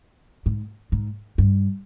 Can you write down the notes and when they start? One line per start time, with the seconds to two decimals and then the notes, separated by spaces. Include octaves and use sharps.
0.46 G#2
0.92 G#2
1.38 G2